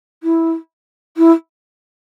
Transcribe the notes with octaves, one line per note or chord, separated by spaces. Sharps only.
E4
E4